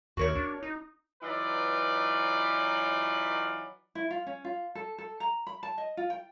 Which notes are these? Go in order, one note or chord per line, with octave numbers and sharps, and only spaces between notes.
D#2 F#4 A#4 C#5
D4
D#4
E3 F#3 D#4 F4 B4 D5
E4
F4
C#4
F4
A4
A4
A#5
B5
A5
D#5
F4
G5